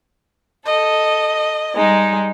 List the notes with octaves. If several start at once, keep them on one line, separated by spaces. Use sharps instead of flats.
A4 D#5
G3 G#3 D#4